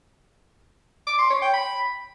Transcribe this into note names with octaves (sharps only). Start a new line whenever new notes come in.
D6
C6
C#5
G5
B5